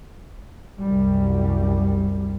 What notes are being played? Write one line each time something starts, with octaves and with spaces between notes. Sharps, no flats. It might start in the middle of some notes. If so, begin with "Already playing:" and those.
C2 F#2 G3